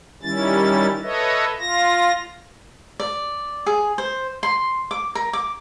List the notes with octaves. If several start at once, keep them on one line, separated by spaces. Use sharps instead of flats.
D#3 G3 C#4 E4 A6
A4 B4 C#5 D#5 E5
F4 A#6
D5
G#4
C5
C6
D6
A#4
D6